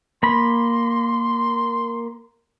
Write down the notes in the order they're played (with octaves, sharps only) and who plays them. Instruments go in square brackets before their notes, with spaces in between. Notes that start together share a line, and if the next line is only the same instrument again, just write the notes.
[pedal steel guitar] A#3 B5 [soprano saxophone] C6